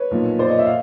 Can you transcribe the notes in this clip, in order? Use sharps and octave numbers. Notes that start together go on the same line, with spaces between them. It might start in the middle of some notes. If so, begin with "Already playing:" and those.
Already playing: B4 C#5
B1 A#2 F3
C5 D5
C#5 D#5
E5
F5